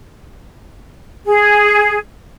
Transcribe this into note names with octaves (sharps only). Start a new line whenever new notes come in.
G#4